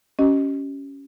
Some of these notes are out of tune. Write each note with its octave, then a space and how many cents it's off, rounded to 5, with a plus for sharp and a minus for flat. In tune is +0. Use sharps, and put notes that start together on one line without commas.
C#4 +0 G4 -35 D#5 +0